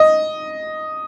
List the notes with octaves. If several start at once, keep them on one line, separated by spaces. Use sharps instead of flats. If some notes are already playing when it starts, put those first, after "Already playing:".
Already playing: D#5